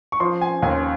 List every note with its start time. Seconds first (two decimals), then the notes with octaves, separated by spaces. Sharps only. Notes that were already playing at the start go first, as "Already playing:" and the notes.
0.12 C#6
0.20 F3 C6
0.41 G#5
0.62 D#2 G#5